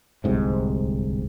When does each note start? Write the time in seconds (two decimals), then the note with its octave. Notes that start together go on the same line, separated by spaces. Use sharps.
0.24 D1 C2 G#2 C3